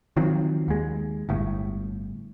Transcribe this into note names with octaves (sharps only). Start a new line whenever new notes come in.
D#3 F3 F#3 C4
D#2 G#3
G1 A2